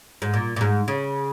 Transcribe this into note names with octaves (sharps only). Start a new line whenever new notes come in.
G#2
A#2
A#2
G#2
C#3